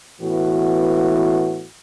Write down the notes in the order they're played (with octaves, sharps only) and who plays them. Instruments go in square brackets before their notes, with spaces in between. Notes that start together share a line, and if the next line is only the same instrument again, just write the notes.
[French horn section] A2 E3 B3 F#4